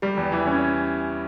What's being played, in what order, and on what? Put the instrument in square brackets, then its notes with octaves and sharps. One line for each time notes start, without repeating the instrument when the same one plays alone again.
[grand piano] G3 [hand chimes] G4
[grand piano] E2
E3
C#4